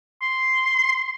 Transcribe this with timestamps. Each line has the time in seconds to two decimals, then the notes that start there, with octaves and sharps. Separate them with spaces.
0.22 C6